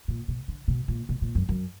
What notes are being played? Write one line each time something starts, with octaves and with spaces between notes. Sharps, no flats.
A#2
B2
D3
B2
A#2
B2
A#2
F#2
F#2